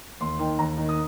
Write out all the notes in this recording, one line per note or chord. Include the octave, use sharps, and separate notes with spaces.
D#2 C6
D#3 G5
D#2 A#5
D#3
D#6